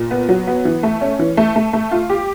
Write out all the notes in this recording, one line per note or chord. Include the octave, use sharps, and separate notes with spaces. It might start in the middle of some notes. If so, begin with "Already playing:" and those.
Already playing: A#2
B3
F#3
B3
E3
A3
C#4
E3
A3
A3
A3
F4
G4